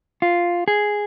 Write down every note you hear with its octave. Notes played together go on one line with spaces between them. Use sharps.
F4
G#4